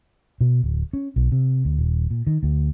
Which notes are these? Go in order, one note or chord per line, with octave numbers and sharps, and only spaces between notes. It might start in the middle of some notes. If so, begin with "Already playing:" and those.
B2
D1
C#4
B1
C3
D2
D#1
A#2
D#3
D2